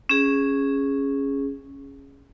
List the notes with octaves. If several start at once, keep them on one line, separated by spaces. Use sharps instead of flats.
C#4 G#4